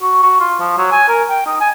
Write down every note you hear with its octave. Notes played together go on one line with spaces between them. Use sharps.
F#4
F#4
F4
F3
F#3
G#5
A#4
G5
D#4
G#5